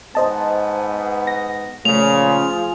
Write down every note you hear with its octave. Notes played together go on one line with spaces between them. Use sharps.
G#2 B3 C5 D#5 A5
A#6
A#2 C#3 F3 A3 F4 G#4 F7